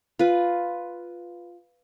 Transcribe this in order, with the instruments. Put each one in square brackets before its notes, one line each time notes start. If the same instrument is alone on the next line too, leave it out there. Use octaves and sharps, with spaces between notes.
[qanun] F4 B4